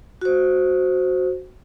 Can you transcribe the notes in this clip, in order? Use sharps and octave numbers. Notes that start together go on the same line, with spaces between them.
F#4 C5